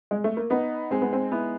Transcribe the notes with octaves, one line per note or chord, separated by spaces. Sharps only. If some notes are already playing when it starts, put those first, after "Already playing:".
G#3
A3
A#3
B3 D#4
G#3 C4
B3
C4
B3 E4